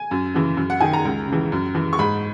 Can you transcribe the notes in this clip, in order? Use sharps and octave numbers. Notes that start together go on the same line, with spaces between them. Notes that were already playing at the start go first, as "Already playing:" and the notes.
Already playing: G#5
F#2
C#3 E3
F#2
F#5
D#3 G#5
A#5
C#2
C#3 E3
F#2
E3
C#6
G#2 B5